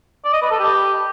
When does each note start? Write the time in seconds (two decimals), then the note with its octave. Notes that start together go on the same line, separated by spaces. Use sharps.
0.24 D5
0.33 D#5
0.42 B4
0.51 A4
0.59 G4